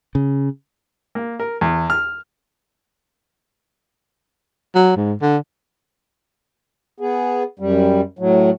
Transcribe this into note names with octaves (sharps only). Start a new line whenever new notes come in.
C#3
A#3
A#4
E2
F6
F#3
G#2
D3
B3 G#4
F#2 G3
A2 F#3